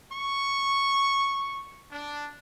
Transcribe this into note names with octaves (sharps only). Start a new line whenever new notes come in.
C#6
D4